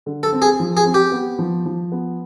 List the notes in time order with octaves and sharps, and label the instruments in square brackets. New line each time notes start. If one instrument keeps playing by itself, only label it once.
[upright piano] D3
[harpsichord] A4
[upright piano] C4
[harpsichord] G#4
[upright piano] F3
[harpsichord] G#4
[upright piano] C4
[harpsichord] G4
[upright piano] B3
F3
F3
B3